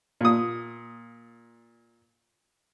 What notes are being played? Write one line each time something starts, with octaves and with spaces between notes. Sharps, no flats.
A#2 D#6